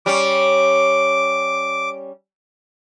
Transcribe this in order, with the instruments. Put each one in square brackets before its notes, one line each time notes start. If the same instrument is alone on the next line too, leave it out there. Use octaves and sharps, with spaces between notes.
[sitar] G3 C#4 [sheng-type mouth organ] D6